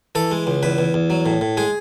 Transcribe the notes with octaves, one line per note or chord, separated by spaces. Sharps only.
E3 A4
G#3
C#2
E2 B4
E2
E2
F#3
A2
A2
G#3 G#4